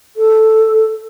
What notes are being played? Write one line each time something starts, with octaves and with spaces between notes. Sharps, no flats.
A4